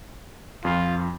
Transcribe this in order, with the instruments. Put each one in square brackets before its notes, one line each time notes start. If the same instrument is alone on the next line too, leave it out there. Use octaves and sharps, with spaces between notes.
[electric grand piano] F2 [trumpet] F4